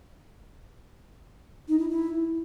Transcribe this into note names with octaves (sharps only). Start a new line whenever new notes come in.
D#4
E4
E4